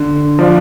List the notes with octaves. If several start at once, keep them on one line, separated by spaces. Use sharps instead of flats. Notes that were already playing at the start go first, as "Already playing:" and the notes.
Already playing: D3
F3 D4 F4